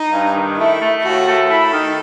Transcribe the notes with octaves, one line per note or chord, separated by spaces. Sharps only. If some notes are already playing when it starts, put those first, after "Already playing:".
Already playing: D#4
G2
D#3
A3 E4
A3
D#2 F#4
A3
E4 A4
D#3